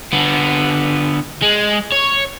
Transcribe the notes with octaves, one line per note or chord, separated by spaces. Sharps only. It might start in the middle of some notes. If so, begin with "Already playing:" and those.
D3 B3
G#3
C#5